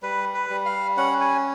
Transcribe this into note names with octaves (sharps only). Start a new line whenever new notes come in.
G3 B4
B4
G3
F5
C#4 F#5
G#5